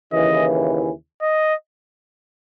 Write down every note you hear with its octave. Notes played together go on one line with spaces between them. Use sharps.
D#2 C#3 E3 D#5
D#5